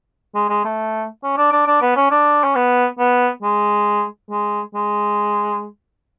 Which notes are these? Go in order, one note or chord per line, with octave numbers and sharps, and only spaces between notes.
G#3
G#3
A3
C#4
D4
D4
D4
B3
C#4
D4
C#4
B3
B3
G#3
G#3
G#3